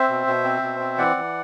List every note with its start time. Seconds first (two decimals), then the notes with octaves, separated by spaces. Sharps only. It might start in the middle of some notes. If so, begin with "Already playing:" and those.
Already playing: C4 C5 E5
0.09 B2
0.27 B2
0.44 C4
0.62 B2
0.80 C4
0.98 E3 D5 F#5
1.16 E3